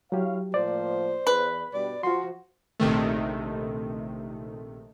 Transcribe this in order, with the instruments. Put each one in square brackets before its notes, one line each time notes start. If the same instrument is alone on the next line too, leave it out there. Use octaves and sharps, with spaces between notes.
[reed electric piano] F#3 G4 [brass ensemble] E4 C#5 F5
[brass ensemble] A2 F3 A#3 [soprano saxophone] C5 [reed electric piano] D5
[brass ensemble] E2 [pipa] B4
[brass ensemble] G2 B2 G3 [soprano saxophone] D5
[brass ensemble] F3 [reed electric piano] F4 C6 [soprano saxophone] F#4
[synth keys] A#1 C3 D#3 A3